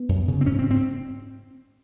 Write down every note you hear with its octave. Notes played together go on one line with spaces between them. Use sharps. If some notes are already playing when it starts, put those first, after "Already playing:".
Already playing: B3
F#2
C#3
C4
G#2 C#4
C4
C4